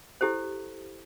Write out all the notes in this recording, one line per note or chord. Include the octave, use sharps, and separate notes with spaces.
E4 G4 A4 C5